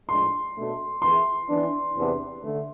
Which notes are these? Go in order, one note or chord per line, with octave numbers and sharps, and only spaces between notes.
A2 F3 G#3 D4 C6
B2 A3 D4 A4
E3 B3 E4 G#4 C6
E3 B3 D4
E2 C3 E3 B3 D4
D3 A3